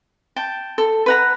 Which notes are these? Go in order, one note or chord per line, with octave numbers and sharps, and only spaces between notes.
G5 A5
A4
B4 F#5 A#5